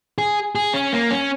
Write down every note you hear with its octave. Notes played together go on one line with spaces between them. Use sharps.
G#4
G#4
C#4
A#3
C#4